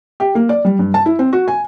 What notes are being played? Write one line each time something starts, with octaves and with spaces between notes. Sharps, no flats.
G4
A#3
D5
G3
G2
A5
E4
C4
F#4
G#5